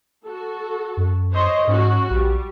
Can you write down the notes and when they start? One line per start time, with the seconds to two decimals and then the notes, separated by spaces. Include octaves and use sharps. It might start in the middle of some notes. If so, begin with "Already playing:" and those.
0.25 F#4 A4
0.97 F#2
1.33 C5 C#5 D#5
1.67 G#2 C#4 F#4
2.10 A#1 G3